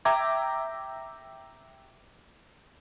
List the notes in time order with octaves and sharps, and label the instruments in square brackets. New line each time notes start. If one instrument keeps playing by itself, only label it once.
[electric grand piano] E5 G5 A#5 D6 G#6